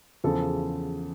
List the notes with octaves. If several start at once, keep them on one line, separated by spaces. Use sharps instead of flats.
E2 C#3 F3 A4